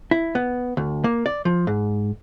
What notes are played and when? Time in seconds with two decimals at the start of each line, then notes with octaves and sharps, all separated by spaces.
0.11 E4
0.35 B3
0.77 D2
1.04 A#3
1.26 D5
1.45 F3
1.67 G#2